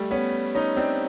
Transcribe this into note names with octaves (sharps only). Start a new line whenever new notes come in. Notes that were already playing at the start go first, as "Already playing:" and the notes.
Already playing: G3 A3
B3 C#4
C#4 D#4
C4 D4